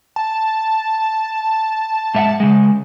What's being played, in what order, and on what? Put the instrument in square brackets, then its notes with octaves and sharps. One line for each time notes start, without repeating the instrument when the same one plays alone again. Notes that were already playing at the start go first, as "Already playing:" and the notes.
[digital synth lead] A5
[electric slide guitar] G#2 E5 F#5
C#3 G#3